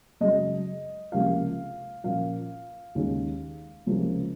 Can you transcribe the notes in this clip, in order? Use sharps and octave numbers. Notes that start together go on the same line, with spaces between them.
F#2 C#3 G#3 D#5
C#2 C3 F3 A#3 C#4 F5
A#2 F3 A#3 C#4 F5
D#2 D#3 G#3 C#4
C#2 C3 F3 A#3 C#4